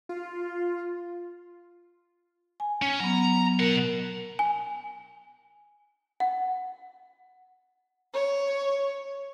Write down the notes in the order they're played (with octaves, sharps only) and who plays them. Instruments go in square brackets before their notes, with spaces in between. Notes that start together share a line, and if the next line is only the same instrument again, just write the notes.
[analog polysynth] F4
[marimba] G#5
[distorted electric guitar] C#4
[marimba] F#3 B3 [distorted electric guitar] A#5
[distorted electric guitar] B2 F#5 [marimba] A#4
[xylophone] G#5
F#5
[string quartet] C#5